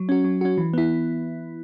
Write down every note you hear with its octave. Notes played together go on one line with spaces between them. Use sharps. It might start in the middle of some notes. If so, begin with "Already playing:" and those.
Already playing: F#3
C#4 F#4
F#3
C#4 F#4
E3
B3 E4